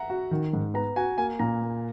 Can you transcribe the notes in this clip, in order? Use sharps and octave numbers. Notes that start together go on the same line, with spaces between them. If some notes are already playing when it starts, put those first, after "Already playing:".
Already playing: E5 F#5 A#5
F#4
D#3
G#2
B3 A#5
F#4 G#5
A#3 G#5
A#2 A#5
A#3